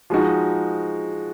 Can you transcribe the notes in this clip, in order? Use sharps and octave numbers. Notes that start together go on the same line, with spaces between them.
F3 G#3 D#4 F#4